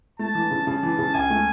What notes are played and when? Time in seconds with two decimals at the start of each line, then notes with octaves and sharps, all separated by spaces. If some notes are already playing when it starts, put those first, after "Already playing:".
0.19 A3 A5
0.35 E3
0.51 C#3
0.67 C#3 A5
0.83 E3
0.99 C#3
1.14 C#2 G#5
1.30 A3